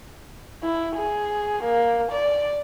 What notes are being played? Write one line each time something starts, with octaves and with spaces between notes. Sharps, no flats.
E4
G#4
A#3
D5